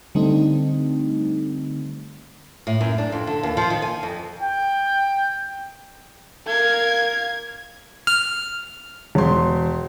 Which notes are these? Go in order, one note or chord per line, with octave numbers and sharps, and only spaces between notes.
D3 G3 A3 C4 D#4
A2
F#2
D4
F2
D3
D#2
F3
D#3
G#5
F2
G5
A#4 F5 G#6
F6
E1 C6